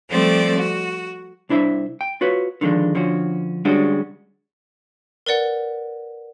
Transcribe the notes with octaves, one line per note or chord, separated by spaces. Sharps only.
F3 G3 A3 C4 D5
F#4
C2 D4 E4 C5 E5
G5
F4 F#4 B4 C#5
D3 D#3 F3 G#3 D4
D3 F3 C#4 F#4
D3 G3 G#3 C#4 D4 F#4
A#4 B4 D5 F#5